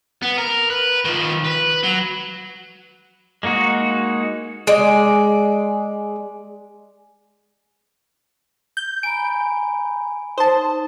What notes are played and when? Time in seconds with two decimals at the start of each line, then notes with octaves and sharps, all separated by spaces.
0.22 B3
0.38 A#4
0.70 B4
1.05 D#3 F3
1.45 B4
1.83 F#3
3.43 G#3 A#3 D#4 F#4
4.67 G#3 D5
8.77 G6
9.03 G#5 A#5 B5 D7
10.38 D#4 C5 A5